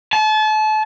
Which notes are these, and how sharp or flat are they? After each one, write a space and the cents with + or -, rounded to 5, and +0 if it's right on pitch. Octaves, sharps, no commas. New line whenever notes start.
A5 -35